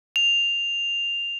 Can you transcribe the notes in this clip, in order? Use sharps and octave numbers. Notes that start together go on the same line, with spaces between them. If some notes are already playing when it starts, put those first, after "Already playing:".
F7